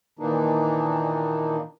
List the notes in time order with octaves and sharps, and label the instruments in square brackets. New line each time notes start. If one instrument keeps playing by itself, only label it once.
[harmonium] A#2 D#3 E3 A#3 D4 D#4